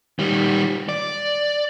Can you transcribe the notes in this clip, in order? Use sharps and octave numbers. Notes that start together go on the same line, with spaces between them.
D#3 G3
D5